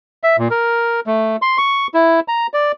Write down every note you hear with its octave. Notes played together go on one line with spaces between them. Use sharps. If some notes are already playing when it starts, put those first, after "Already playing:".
E5
A#2
A#4
A3
C6
C#6
E4
A#5
D5